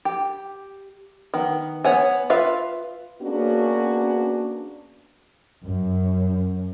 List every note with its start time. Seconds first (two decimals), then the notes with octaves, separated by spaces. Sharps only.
0.05 G4
1.34 D#3 B3
1.84 B3 C#5 F#5 G#5
2.30 F4 B4 E5 F5
3.22 A#3 B3 C#4 D4 F#4 G#4
5.67 F#2